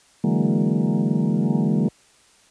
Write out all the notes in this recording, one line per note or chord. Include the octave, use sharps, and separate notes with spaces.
D3 E3 F#3 G#3 A#3